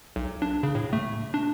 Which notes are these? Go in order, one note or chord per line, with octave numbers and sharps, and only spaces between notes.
B1
D4
C#3
A2
A3
D4